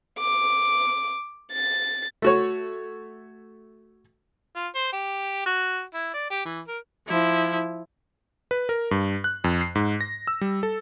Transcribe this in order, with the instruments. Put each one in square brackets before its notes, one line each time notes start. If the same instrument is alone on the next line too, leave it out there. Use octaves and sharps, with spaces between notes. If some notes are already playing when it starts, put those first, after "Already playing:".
[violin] D6
A6
[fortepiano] A3 F#4 C#5
[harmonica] F4
C5
G4
F#4
E4
D5
G4
E3
A#4
[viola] F3 E4
[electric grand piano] B4
A#4
G2
F#6
F2
C7
G#2
A#6
E6
G3
A4